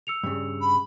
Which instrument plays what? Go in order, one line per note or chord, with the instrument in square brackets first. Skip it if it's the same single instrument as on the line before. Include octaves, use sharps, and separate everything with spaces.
[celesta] E6 C#7 F7
[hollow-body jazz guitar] G2 C#3
[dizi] B5